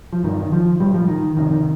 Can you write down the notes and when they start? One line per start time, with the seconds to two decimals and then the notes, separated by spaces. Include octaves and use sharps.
0.13 F3
0.23 G2 D3 D#3
0.40 D#3
0.52 F3
0.80 A2 G3
0.94 F3
1.08 D#3
1.36 F2 C3 D#3
1.51 D#3